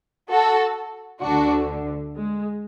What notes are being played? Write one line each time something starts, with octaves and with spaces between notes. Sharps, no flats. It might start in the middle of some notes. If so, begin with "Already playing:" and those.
F#4 A4
D2 D3 D4 F#4
G#3